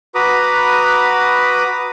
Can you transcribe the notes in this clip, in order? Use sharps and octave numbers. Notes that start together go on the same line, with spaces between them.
F#4 B4 A#5 B5 D6 D#6